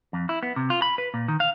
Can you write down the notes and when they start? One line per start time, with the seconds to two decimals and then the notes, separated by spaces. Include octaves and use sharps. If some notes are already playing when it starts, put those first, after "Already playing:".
0.13 F2
0.29 E4
0.43 B3
0.56 C3
0.70 F4
0.82 B5
0.98 B4
1.14 A#2
1.28 D#3
1.40 F5